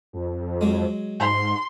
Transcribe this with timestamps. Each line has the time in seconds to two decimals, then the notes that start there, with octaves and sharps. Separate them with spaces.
0.13 F2
0.61 F#3 G#3
1.20 G#2 C6